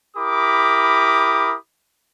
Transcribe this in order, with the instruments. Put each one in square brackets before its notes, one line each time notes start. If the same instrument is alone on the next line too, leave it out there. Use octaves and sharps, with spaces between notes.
[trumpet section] E4 G4 A#4 B5 D6 D#6